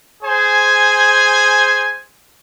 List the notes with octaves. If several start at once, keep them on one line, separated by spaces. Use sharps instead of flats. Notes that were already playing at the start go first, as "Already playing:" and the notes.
G#4 C5 G#5